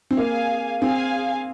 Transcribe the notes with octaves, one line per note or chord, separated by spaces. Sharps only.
C4
A#3 G#4 F5 G#5
C4 G#4 F5 G#5